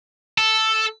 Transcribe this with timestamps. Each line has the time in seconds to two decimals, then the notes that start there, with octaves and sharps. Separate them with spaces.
0.38 A4